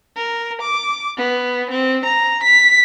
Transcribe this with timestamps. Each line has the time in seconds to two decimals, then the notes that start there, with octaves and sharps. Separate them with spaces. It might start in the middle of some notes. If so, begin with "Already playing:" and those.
0.17 A#4
0.62 D6
1.17 B3
1.71 C4
2.06 A#5
2.44 B6